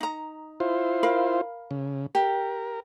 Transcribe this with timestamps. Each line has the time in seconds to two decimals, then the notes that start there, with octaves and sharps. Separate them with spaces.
0.01 D#4 A#5
0.60 E4 F4 C5
1.03 A#4 F5 B5
1.71 C#3
2.15 G4 A#4